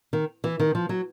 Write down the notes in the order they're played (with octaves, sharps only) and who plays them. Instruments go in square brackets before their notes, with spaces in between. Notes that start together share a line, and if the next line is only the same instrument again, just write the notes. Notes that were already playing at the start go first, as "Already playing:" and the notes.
[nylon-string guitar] D#3
E3
D#3
F3
F#3